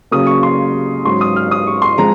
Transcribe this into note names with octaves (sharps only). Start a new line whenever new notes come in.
C#3 F#3 A#3 D#6
C#6
C6
G#2 F#3 C#4 C6
D#6
F6
D#6
C#6
C6
F3 G#3 C4 A#5